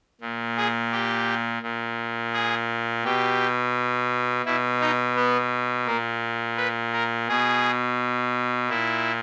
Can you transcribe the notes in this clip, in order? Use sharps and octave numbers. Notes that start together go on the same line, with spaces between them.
A#2
G#4
G4
A#2
G#4
B2 G4
B2 E4
D#4
B3
A#2 A#3
B4
A#4
B2 G#4
A#2 E4